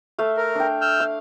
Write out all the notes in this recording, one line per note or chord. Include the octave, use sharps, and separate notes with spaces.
A3 E5 F5
A#4
D4 G5
E6 F6 G6
F5